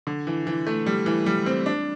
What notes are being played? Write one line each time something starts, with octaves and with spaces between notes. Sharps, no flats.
D3
E3
E3
A3
G3
E3
G3
C4
D4